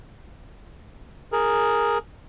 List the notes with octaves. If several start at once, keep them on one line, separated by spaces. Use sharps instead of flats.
G#4 A#4